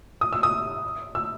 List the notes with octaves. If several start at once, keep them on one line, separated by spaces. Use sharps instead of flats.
D#6
E6
D#6
E6